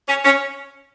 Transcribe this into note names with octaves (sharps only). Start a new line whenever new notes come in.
C#4
C#4